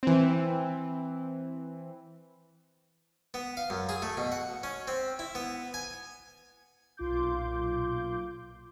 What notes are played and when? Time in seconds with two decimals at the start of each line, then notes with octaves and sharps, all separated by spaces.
0.03 E3 C4
3.34 B3
3.57 F5
3.70 F#2
3.89 G#4
4.02 A3
4.17 B2
4.32 F#5
4.63 C#4
4.88 C4
5.19 E4
5.35 B3
5.74 G#5
6.97 B1 A#2 F4 C6 D6 G6